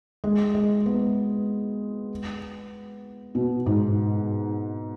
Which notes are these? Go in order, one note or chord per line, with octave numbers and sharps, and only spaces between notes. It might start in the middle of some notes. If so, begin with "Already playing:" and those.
G#3
G#3
B3
B2
G#2